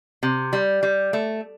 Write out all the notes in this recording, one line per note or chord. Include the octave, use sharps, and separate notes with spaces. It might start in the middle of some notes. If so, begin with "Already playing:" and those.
C3
G3
G3
A3